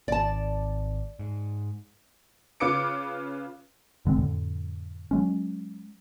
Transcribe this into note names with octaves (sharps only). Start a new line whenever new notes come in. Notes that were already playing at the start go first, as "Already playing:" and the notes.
G#1 D5 A5
G#2
C#3 F4 B4 D6 C#7 D7
F#1 D3 G#3 C4
F2 A2 D3
F#3 G#3 C#4